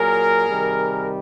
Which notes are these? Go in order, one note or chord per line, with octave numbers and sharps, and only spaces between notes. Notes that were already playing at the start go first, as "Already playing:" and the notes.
Already playing: A#2 F#3 G#4 A#4
C3 D#3 G3